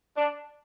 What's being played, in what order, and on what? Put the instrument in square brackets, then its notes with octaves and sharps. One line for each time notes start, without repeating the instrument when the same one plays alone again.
[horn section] D4